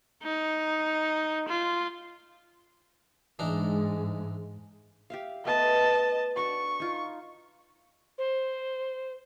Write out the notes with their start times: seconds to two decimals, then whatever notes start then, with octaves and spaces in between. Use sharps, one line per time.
0.23 D#4
1.49 F4
3.39 G#2 E3 G#3 D4 D#4
5.10 G4 E5 F5
5.45 A3 B3 B4 D#5 A5
6.37 D4 F#4 D5 C#6
6.80 D#4 F4
8.18 C5